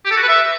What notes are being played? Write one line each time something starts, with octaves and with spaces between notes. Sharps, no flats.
G4
A4
F#4
B4
E5